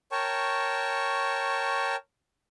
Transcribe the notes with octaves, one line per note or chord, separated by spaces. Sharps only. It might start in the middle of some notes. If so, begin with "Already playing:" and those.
A#4 C#5 G5 A5 C#6